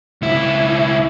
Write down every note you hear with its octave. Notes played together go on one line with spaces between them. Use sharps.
C#2 E4